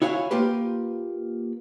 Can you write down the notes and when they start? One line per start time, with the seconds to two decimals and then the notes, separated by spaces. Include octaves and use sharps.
0.02 E4 F#4 C#5 F5 G5 G#5
0.31 A#3 F4 G4 B4